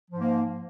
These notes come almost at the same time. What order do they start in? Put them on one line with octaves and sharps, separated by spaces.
F3 G#2 A#3